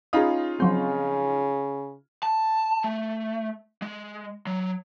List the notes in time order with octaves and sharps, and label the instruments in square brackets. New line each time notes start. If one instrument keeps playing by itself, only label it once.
[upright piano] C#4 D#4 F4 [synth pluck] G#4 B5 D#6
[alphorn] C#3 [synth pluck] F3 F#3 C4
[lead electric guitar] A5
A3
G#3
F#3